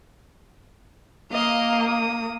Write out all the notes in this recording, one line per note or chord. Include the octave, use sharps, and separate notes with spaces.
A#3 D#5 F5
D#6